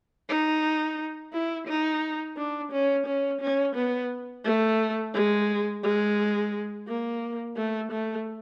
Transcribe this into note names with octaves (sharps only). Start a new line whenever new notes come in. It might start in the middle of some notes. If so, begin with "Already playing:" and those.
D#4
E4
D#4
D4
C#4
C#4
C#4
B3
A3
G#3
G#3
A#3
A3
A3